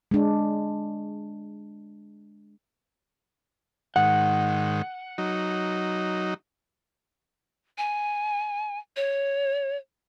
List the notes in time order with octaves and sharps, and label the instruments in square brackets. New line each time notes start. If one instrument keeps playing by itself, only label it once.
[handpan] G#3 D4
[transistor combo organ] G#2 D#3 [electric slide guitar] F#5
[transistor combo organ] F#3 D#4
[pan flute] G#5
C#5